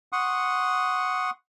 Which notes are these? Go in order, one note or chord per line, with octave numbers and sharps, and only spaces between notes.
F#5 C6 C#6 D#6